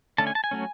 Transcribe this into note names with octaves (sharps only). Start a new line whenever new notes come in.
D3 A3 C#4 A5
G#5
A5
G#5
F#3 A3 C#4